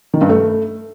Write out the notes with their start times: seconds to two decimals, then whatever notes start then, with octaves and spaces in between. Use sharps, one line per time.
0.14 D#3
0.21 G2
0.29 A3